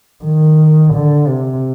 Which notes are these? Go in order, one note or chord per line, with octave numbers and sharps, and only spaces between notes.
D#3
D3
C3